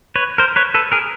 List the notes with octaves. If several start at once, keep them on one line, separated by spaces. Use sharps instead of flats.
B4 C#5
A#4 C5
B4 C#5
A4 B4
G#4 A#4